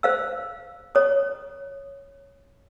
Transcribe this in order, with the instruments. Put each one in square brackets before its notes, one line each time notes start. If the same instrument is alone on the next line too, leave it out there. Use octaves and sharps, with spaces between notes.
[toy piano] C5 F5 E6
C#5 D#6